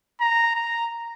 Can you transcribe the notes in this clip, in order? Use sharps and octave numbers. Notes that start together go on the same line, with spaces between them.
A#5
A#5